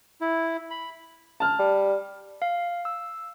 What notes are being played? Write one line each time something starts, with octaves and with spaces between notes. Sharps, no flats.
E4
B5
A5 F6
G3
F5
E6